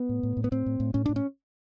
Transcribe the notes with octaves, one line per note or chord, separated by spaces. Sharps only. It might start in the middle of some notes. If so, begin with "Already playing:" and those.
Already playing: B3
A2
A2
A2
B3
A2 C4
A2
A2
A2 C#4
A2 D4
C#4